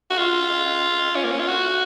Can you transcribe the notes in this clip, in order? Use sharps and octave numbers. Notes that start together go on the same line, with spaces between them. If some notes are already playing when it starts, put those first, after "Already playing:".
F#4
F4
C#4
A#3
C#4
F4
F#4